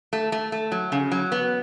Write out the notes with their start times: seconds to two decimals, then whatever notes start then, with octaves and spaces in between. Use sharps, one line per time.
0.13 A3
0.32 A3
0.52 A3
0.72 F#3
0.92 C#3
1.12 F#3
1.32 B3